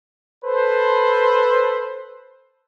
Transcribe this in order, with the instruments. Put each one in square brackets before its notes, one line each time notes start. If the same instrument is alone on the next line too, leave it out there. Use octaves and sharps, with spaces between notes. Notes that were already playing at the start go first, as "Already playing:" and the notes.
[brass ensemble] A4 B4 C5